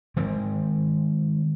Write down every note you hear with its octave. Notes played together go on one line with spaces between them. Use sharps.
D#3 G#3 C4